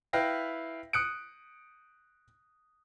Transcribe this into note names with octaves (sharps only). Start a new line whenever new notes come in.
E4 B4 F5 G5 A#6
D#6 F#6 C#7 D7